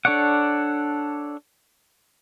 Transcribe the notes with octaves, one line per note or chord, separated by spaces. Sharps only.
D4 A4 C#5 D5 F#5